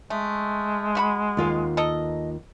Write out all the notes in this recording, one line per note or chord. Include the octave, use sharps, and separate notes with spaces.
G#3 A3
A3 F#4 B5
D#2 F4 F5
A4 A#4 D#5